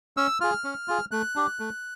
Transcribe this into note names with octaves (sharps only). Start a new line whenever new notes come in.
C#4 E6
F4 G#4 F6
C#4
F4 G#4
A3 F#6
D4 G4
A3